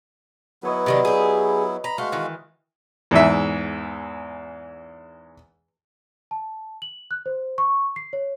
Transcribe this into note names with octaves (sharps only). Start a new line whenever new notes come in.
F#3 B3 E4 B4 C#5 D#5
C3 D#3 D4
G4 G#4
A#5 B5
G#3 A3 F#4 F5
D#3 E3
E2 G#2 E5
A5
F#7
F#6
C5
C#6
C7
C#5